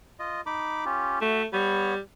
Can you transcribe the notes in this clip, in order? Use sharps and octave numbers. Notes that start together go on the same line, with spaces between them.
F4 D#5
D#4 B5 D6
C#4 F4 G4
A3 F#4 E5
G3 B3 C#5 B5